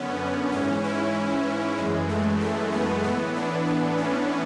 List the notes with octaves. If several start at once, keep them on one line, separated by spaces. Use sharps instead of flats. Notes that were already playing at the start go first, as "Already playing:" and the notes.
Already playing: F#2 D3 B3 C#4
G#2 E3 C#4
E4
F#2 E3 G#3
A3
A3
B3
A2 E3 B3
D4
D4
C#4